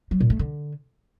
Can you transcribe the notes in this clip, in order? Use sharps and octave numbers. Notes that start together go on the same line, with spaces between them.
F#3
A#2
A3
D3